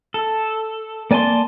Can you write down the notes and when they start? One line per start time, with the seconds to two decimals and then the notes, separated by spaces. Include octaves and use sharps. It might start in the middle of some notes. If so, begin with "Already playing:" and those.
0.14 A4
1.11 A#3 D5 G#5 A5 C6